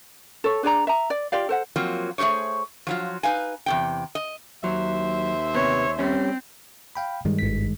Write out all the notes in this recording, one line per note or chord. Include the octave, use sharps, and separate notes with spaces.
A4 C#5
D4 G#4 D5 A#5
E5 A#5
D5
F4 G4 D5 F5
A4 C5 F#5
F3 F#3 A#3 C4 F4
A3 G#4 A4 C5 C#5
F3 F#3 F4
D#4 B4 F5 G#5
E2 C3 G5
D#5
D#2 F#3 C5 E5
C3 B3 C#5
G3 C4 C#4
F5 G5 B5
G2 D#3 G3 G#3
G#1 B6